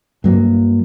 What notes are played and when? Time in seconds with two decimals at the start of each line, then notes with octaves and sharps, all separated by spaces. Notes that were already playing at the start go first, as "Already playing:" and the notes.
0.24 G2 F#3 A#3